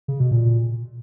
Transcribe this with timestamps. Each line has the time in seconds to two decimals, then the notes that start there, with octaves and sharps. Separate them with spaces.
0.08 C#3
0.20 B2
0.31 A#2